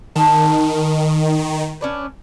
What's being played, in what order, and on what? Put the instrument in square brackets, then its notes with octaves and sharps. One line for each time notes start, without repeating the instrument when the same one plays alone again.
[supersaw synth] D#3 [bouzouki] A5
[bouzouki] C#4 D4 B4